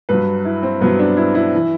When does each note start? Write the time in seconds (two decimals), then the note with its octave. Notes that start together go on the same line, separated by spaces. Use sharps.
0.09 G2 F#3 B4
0.45 E4
0.63 C4
0.81 G2 F#3 B3
0.99 D4
1.17 E4
1.35 E4
1.54 E3